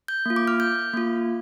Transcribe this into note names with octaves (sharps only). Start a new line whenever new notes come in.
G6
A#3 F4
D6
F6
G6
A#3 F4